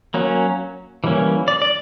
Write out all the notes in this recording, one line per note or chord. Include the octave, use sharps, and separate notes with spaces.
F#3 A#3 C#4
E3 G3 A#3 C#4
D5
D5